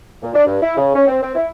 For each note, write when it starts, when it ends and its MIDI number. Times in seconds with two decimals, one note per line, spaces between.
0.22 0.30 46
0.34 0.43 62
0.46 0.57 43
0.62 0.75 64
0.77 0.91 49
0.95 1.06 61
1.07 1.18 60
1.22 1.33 60
1.35 1.48 64